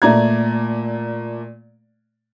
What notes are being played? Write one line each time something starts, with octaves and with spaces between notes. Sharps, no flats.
A#2 A3 D5 A#5 G#6